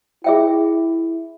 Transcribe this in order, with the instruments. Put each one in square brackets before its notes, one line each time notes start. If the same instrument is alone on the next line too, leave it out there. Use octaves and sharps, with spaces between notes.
[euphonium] E4 [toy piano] G#4 E5 G5